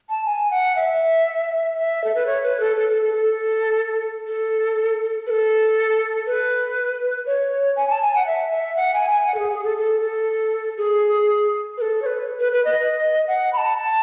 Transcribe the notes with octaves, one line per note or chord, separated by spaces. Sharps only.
A5
G#5
F#5
E5
E5
A4
B4
C#5
B4
A4
A4
A4
A4
A4
A4
B4
A4
B4
C#5
G#5
A5
G#5
F#5
E5
E5
F#5
G#5
G#5
F#5
A4
G#4
G#4
A4
A4
A4
G#4
B4
A4
C#5
B4
B4
B4
D#5
F#5
B5
A5
A5